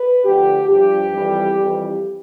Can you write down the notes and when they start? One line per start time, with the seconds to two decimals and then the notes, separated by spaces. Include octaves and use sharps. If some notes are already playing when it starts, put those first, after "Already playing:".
Already playing: B4
0.24 D2 D3 F3 G4
0.67 G2 F3 G4
1.11 F2 E3 G3
1.54 F2 E3 G3